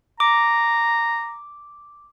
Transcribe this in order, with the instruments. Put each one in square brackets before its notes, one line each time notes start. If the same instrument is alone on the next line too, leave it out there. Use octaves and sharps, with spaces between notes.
[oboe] A#5 [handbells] D6